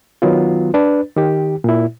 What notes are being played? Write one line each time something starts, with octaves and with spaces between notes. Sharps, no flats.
D#3 F#3 B3 F4
D4 B4
D#3 G4
A#2 E4